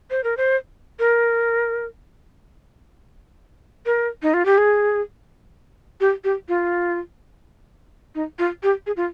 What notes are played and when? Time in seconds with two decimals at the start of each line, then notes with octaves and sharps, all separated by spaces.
0.11 C5
0.24 A#4
0.37 C5
0.99 A#4
3.86 A#4
4.23 D#4
4.34 F4
4.45 G4
4.58 G#4
6.00 G4
6.24 G4
6.49 F4
8.15 D#4
8.39 F4
8.63 G4
8.87 G#4
8.97 F4